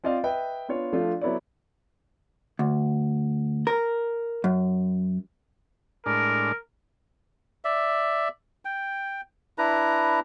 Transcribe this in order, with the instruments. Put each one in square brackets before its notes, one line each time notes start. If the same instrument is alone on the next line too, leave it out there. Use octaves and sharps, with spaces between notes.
[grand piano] C4 F4 D5 D#5 F5
B4 D#5 E5 G5
B3 D4 F4 C#5
F3 A3 D4 F4
F#3 B3 E4 A4 C#5 D5
[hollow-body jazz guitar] D2
A#4
F#2
[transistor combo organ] A2 G#3 D4 [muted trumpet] A#4
[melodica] D5 E5
G5
D4 E4 B4 A#5